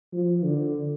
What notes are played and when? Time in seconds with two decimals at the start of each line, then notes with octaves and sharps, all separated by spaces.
0.13 F3
0.44 D3